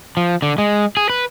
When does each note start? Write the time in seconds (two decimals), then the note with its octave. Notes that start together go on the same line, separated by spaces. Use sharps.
0.17 F3
0.42 D3
0.58 G#3
0.97 G#4
1.10 B4